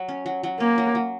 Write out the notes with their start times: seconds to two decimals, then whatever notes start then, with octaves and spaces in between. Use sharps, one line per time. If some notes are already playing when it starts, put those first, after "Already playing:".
Already playing: F#3
0.09 C#4
0.26 F#3
0.43 F#3
0.60 A#3 C#4
0.78 F#3
0.95 F#3